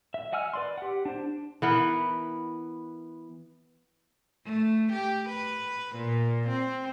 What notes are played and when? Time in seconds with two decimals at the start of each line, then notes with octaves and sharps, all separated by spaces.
0.14 E5
0.33 D#5 F#5 G#5 E6 F6
0.53 B4 D5 C6
0.78 G4 F#5
1.05 D4 C5
1.62 E3 B3 A#4
4.45 A3
4.93 G4
5.29 B4
5.96 A#2
6.49 C4